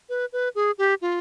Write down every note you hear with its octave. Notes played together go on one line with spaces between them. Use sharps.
B4
B4
G#4
G4
F4